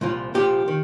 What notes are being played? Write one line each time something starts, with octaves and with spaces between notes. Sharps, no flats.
C2 A#2 F3
C2 A#2 F3 G4
D#3